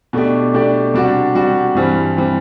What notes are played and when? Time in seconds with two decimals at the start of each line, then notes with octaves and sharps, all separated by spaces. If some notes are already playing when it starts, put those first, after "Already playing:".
0.13 B2 A3 D4 G4 D5
0.54 B2 A3 D4 G4 D5
0.94 C3 G3 D4 F#4
1.35 C3 G3 D4 F#4
1.75 G2 E3 G3 C4
2.17 E3 G3 C4